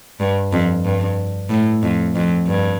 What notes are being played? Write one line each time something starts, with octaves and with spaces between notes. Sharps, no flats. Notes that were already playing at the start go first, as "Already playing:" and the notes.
G2
F2
G2
A2
F2
F2
G2